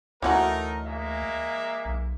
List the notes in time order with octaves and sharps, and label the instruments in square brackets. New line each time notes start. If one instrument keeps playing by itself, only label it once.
[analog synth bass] D2 [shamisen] E3 C#4 F#4 [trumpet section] A3 D#4 A#4
[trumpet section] G#3 A#3 E5
[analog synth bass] B1